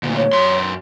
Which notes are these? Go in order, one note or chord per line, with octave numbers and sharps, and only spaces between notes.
D2 A#2
C#5
F#2 C6